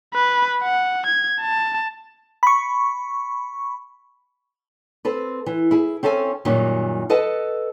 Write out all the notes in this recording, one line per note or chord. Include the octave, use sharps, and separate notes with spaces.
B4
F#5
G#6
A5
B5 C#6
C4 A4 B4
E3
E4 G#4
C4 C#4 A4 E5 G#5
F#2 A#2 D#3 F#3 G3 C#4
A4 B4 D#5 F#5 A5